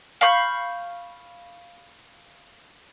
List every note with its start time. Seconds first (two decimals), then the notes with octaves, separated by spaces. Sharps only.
0.21 F5 B5 C#6 G6